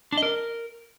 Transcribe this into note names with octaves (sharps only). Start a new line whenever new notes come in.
D4
D#5
A#4